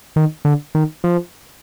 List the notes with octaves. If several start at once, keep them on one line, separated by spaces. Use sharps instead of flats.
D#3
D3
D#3
F3